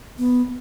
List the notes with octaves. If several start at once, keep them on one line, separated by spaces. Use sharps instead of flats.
B3